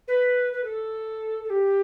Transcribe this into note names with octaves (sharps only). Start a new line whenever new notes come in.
B4
B4
A4
A4
G4